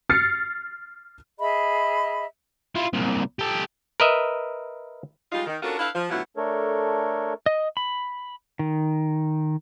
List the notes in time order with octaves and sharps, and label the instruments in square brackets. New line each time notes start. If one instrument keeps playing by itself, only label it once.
[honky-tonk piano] F6 A6 C7 C#7
[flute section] G#4 D#5 E5 B5
[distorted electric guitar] E4 F4
C2 A#2
G4 A4
[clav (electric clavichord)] A#4 B4 D#5 E5
[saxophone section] G3 G#3 D#4 F4
D#3
C#4 D4 F4 F#4 A4 A#4
D4 E4 A4 B4 F5
F3
D2 B2 F#3 E4 F4 F#5
[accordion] A3 D4 A4 A#4 C#5
[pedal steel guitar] D#5
B5
D#3